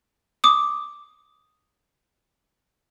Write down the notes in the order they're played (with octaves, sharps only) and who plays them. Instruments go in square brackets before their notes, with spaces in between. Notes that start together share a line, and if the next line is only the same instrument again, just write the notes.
[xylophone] D6 D#6